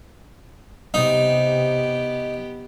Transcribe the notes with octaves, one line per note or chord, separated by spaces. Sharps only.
C3 B3 D#4 G4